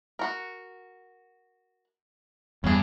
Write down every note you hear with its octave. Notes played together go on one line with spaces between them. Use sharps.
F#4 A#4
E2 G2 C#4 G#4